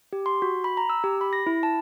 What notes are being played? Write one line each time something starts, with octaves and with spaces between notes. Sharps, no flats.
G4
C6
F#4
B5
A#5
E6
G4
B5
A#6
E4
A5